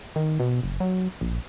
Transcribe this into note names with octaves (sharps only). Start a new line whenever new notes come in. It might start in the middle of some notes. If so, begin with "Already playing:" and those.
D#3
B2
F#1
F#3
A#1